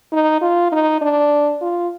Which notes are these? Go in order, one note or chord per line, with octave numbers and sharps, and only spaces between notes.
D#4
F4
D#4
D4
F4